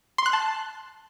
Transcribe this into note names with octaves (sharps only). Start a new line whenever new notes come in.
C6
F#6
A5